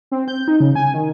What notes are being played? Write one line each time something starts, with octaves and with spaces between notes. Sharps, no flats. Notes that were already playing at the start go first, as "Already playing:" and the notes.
C4
G6
D#4
C#3
G#5
D#3